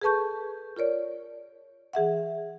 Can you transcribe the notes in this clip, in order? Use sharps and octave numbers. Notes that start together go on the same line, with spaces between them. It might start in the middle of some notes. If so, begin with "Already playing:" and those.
G#4 A4 B4 A5 C#6 G6
F4 A#4 C#5 D5
E3 G#4 E5 F#5